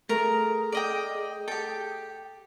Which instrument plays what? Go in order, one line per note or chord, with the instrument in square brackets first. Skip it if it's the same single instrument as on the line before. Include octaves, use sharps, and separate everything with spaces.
[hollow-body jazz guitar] A3 [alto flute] G#4 [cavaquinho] A#4
[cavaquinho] D5 D#5 G5
[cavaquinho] G4 G5 [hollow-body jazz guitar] A4